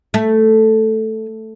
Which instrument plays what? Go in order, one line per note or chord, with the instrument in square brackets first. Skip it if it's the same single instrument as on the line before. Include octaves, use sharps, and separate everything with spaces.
[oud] A3